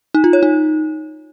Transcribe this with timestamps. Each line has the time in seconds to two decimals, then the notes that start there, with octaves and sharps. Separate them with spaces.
0.15 D#4
0.24 F4
0.33 C#5
0.43 D#4